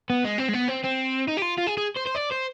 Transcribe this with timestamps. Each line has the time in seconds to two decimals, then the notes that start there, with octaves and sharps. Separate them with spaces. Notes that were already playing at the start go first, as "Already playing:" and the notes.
0.10 B3
0.24 G#3
0.38 C4
0.48 G#3
0.53 B3
0.68 C4
0.84 C4
1.28 D#4
1.37 G4
1.42 F4
1.58 F4
1.67 G#4
1.77 G#4
1.97 C5
2.07 C5
2.16 D5
2.32 C5